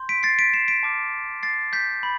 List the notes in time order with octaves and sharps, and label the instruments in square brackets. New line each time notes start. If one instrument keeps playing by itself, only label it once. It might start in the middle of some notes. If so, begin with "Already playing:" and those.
Already playing: [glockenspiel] C6 G6
B6 D7
A6 C7
B6 D7
C7 E7
B6 D7
A5 D6 F6
A6 C7
G6 B6
B5